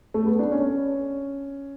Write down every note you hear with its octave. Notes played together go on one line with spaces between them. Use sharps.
A3
B3
D4
C#4